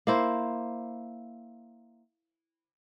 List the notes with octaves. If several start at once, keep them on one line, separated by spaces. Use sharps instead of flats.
A#3 E4 C5